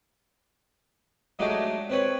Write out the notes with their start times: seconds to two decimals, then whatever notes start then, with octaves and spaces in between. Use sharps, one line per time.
1.39 F#3 G#3 A3 D4 D#4 G4
1.90 C4 B4 C#5 B5